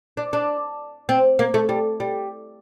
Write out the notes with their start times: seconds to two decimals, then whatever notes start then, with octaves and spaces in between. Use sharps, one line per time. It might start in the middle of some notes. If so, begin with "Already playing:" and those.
0.17 D4
0.33 D4
1.09 C4
1.39 A#3
1.54 A3
1.69 G3
2.00 G3